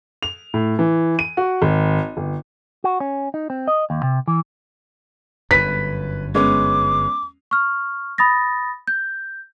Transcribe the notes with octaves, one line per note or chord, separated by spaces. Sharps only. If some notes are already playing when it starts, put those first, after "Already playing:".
F7
A2
E3
D#7
F#4
G#1
G1
F#4
C#4
D#4
C4
D#5
D#2
C3
E3
G1 F#2 B4 B6
G#3 B3 C#4 D6
C#6 F6
B5 D#6 A6 A#6
G6